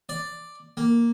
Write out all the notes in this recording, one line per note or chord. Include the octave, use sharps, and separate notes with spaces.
D5
A#3